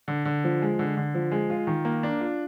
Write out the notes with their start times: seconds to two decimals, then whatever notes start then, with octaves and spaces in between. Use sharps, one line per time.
0.08 D3
0.25 D3
0.44 F3
0.62 G#3
0.79 D3
0.97 D3
1.15 F3
1.31 G#3
1.50 F4
1.67 D#3
1.85 A#3
2.03 D4
2.21 F4